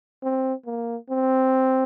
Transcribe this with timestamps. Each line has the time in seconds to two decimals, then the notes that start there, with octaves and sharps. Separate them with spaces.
0.23 C4
0.66 A#3
1.10 C4